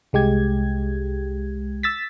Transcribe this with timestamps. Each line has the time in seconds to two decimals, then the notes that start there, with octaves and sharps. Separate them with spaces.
0.13 C2 G#3 G4 G#6
1.83 E6 A6 B6